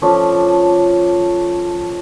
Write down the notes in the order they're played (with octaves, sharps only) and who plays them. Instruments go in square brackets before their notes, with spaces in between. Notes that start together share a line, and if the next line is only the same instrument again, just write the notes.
[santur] F3 A3 C#4 D4